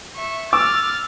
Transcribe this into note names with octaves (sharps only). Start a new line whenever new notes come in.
E5 C#6
D6 E6 F6 A6